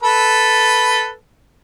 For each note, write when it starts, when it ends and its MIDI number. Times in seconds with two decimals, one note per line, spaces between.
0.03 1.11 69
0.03 1.11 71